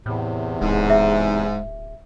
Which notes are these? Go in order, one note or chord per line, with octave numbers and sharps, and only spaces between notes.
E2 A2 C3
D1 G#2
E5